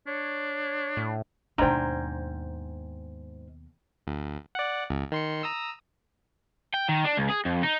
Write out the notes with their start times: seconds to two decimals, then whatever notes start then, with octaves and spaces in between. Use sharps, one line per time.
0.07 D4 C#5
0.97 A2
1.58 D#2 G#2 B2 D4 C5 G5 G#5 A#5
4.07 D2
4.55 D5 F#5
4.90 C#2
5.12 D#3 C6 C#7
5.43 A#5 D#6 E6
6.74 G5
6.89 D#3
7.04 D4
7.17 C#2
7.29 G#4
7.45 F2
7.63 D#4